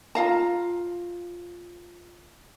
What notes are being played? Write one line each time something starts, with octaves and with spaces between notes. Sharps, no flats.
F4 F5 A#5